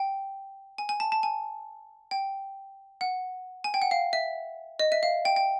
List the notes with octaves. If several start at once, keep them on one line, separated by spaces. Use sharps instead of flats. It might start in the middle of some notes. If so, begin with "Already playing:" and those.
Already playing: G5
G#5
G#5
A5
A5
G#5
G5
F#5
G#5
G5
F#5
F5
E5
D#5
E5
F5
G5
G5